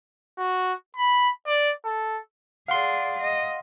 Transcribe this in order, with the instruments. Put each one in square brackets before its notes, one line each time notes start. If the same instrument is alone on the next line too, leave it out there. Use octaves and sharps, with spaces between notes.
[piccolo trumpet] F#4
B5
D5
A4
[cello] G#4 D5 [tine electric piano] F5 F#5 C6
[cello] D#5